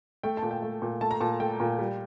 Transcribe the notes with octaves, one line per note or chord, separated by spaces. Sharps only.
A3 G5
A5
A#2
G5
A3
A#2
A3 A5
A#5
A#2 A5
A3 G5
A#2
G3